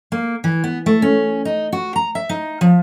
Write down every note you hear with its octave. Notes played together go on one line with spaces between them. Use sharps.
A#3
E3
B3
A3
C#4
D#4
F#4
A#5
E5
D#4
F3